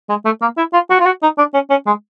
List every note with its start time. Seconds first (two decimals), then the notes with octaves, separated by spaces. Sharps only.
0.09 G#3
0.25 A3
0.42 A#3
0.57 E4
0.73 F4
0.90 F#4
1.00 F4
1.06 F#4
1.23 D#4
1.38 D4
1.54 C#4
1.70 C#4
1.87 G#3